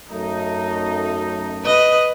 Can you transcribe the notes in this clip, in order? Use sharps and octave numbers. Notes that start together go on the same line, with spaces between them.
F#2 A3 D#4
B4 D#5